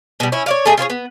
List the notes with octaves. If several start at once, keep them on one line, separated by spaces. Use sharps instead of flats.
B2 G3
C#4 E4
C#5 D5 F5
A3 G#4 D#5 E5
F4 G#4 C5 C#5
B3